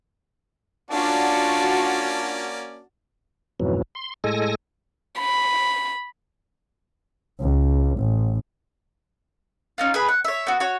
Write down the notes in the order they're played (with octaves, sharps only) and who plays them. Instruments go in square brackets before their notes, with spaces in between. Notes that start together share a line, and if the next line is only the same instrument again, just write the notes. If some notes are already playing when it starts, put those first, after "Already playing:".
[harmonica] A#3 C#4 D5 [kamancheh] D4 F4 [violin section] F#4 [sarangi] A5
[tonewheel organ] F2 G#2 B2 E3 F#3
C6
A2 G#3 A4 G#5 A#6
[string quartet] B5
[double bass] C#2
A1
[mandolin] C#4 D#4 F4
G#4 B4 B5
F#5
C#5 E5
B3 F#4
F#4 C#5